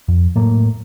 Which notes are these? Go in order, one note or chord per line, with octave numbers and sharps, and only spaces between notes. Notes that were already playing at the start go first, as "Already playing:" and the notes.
F2
A2 F#3 A3 A#3